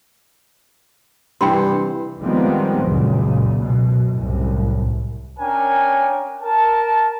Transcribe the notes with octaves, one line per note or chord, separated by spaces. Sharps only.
G2 C3 E3 C5 G5 B5 C6
D#3 F3 G3 G#3 B3 C4
C#2 F#2 A#2 C#3
F#2 B2
C2 F#2 A2
C#4 D4 A#4 G5 G#5
A#4 A5